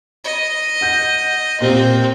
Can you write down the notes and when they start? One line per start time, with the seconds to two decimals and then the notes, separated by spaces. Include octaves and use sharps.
0.24 D#5
0.81 F#5 G6 A#6
1.61 A#2 C4 G4 G7